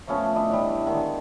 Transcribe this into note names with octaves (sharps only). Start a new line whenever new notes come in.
F3 A3 B3 C#4
D4 E4 D#5
A2 E3 G3
D3 D#3 G#3